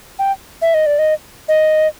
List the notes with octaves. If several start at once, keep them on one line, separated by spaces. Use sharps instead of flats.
G5
E5
D#5
D5
D#5
D#5